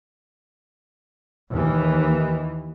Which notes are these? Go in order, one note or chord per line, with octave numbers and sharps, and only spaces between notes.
D#2 E3